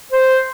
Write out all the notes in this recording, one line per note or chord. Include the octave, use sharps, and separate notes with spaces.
C5